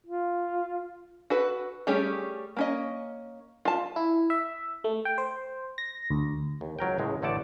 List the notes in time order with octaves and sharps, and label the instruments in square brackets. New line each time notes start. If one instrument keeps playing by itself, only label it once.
[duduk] F4
[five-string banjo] F#4 A4 B4
G3 A3 C#4 G4 G#4
A#3 C#4 D#5
F4 A5
[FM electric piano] E4
E5
A3
G5
C5
A#6
D2
[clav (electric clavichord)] D#2
C#2 F#3 A#4 G5
C#2 A2 G#3
A1 D3 A3 A4 D5 A5